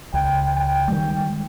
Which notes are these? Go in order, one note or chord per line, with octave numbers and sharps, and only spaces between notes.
C#2 G5
G5
D#3 G3 G#3